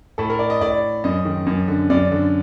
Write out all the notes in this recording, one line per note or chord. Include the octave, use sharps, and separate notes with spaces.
A2 A4
A#4
D5
D#5
A2 D5
F#2 D#5
D#3
F#2
D3
F#2 D5
D3